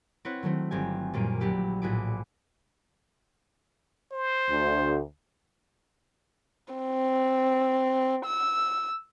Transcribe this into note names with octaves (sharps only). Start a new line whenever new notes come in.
C4 E4 B4 C#5 F#5
D#3 F#3 A3 C4
G1 C4 G4 G#5
F#2 A#2 G3 A#3 D7 D#7
A#1 F#3 D4 G4 B5 E6
A#1 A2 F#4 G#4 B5 D6
C5
D2
C4
E6